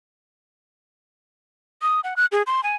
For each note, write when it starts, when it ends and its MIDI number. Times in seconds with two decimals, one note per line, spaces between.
1.82 2.00 87
2.04 2.14 78
2.17 2.26 90
2.32 2.42 68
2.47 2.63 84
2.63 2.76 80